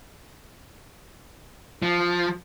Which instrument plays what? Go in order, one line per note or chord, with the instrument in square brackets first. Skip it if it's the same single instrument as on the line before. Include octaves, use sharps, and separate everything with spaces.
[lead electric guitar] F3